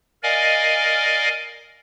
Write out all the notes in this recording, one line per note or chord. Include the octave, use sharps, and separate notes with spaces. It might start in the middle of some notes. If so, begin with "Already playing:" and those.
A#4 D5 D#5 F5 G#5